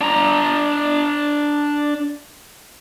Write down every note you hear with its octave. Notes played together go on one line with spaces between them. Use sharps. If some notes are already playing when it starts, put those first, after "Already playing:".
D4 A#5